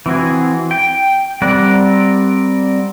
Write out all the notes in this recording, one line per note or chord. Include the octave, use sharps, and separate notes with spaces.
E3 C4 F#4 G#4
G5
G3 C4 A#4 D5 F#5